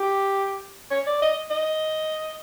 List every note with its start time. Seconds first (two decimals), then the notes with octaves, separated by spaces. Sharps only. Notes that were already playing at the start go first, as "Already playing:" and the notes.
Already playing: G4
0.91 C#5
1.07 D5
1.22 D#5
1.51 D#5